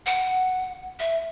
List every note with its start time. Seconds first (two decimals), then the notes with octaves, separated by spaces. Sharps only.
0.06 F#5
1.00 E5